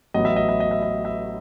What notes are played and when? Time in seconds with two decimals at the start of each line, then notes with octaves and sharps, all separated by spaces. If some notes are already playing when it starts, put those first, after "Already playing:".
0.14 A1 A2 F#3 B3 D#5
0.25 E5
0.36 D#5
0.49 E5
0.60 D#5
0.71 E5
0.83 D#5
1.05 E5